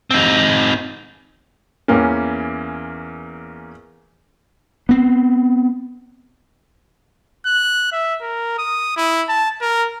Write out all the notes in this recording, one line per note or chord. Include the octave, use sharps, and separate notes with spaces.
C4 D#4
E2 E3 A#3 C#4
B3 C4
F#6
E5
A#4
D#6
E4
A5
A#4